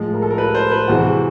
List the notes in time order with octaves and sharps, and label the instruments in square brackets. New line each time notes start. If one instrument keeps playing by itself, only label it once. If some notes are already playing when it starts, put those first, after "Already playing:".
Already playing: [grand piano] A2 F3 G#3
A#4
A4
A#4
B4
C5
B4
C3 E3 G#3 F#4